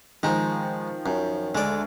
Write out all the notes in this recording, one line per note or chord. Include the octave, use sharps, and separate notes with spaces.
D#3 F3 G#3 D#4
F#2
D2 G#3 D5